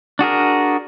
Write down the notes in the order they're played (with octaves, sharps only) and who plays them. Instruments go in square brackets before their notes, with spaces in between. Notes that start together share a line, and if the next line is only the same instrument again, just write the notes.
[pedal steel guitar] D4 F#4 G#4 A#4